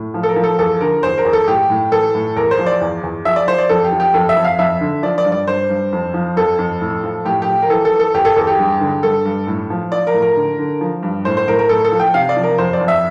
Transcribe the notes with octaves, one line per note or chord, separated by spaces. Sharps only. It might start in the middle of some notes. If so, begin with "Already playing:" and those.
Already playing: A2
F3
A4
A#4
F3
A4
E2 A4
D3 A#4
E2 C5
A#4
E2
A4
A2 G4
A2
E3 A4
A2
E2 A#4
C5
F3
D5
E2
E2
F3 E5
D5
F3 C5
D5
F2 A4
G4
F3
G4
F2 A4
E5
F2
F5
F2 E5
D3
F3 D5
D5
G2
D5
G2 C5
G2
F2
F3
F2 A4
F2
A2
F3
A2 G4
G4
F3
A#4
E3 A4
A4
E3
A4
E2 G4
A4
E2 A4
G4
G2
D3
G2 A4
G2
A2
F3
F3 D5
A#4
A2
A#4
D3
D3
F3
G2
A2 C5
C5
A2 A#4
A#4
A2 A4
A4
F3
G5
C3 F5
D5
F3
A#4
F2 C5
D5
F2
E5